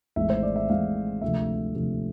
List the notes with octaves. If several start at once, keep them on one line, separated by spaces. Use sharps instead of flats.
G#1 G#2 E3 A3 E5
C5
D5
E5
G#1 G#2 E3 A3 F5
D2 C3 F3 E5
D2 C3 F3